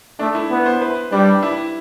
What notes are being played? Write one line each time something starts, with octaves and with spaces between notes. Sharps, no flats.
A3 D4
E4
B3
C5
B4
G3 D4
E4